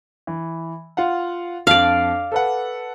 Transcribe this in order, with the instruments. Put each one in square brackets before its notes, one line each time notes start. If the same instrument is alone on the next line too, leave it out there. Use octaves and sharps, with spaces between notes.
[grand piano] E3
F4 F5 F#5
[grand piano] F2 D4 [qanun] D5 F5
[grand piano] A4 B4 F#5